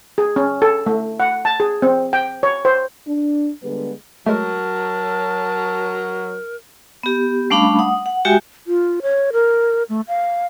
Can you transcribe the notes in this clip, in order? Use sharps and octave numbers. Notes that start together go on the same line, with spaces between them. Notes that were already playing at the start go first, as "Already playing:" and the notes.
G#4
C#4
A4
A3
F#5
A5
G#4
C4
G5
C#5
C5
D4
D3 G3 G#3 B3 G#4 B4
F#3 G#3 A3 A#4 A5
B3 G4
G3 A3 C#4 D4 F5 B5
F#5 D#6
F#5
G#3 F#4 G4 E5 G5 G#5
F4
C#5
A#4
A3
F5